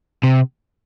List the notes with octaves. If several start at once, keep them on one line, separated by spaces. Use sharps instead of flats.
C3